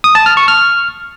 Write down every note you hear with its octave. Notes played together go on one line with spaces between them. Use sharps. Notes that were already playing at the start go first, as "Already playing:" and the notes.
D#6
A5
F6
C#6
F6